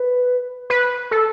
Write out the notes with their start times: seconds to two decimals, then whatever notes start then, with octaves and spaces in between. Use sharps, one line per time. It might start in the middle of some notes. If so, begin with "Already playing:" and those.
Already playing: B4
0.70 B4
1.11 A4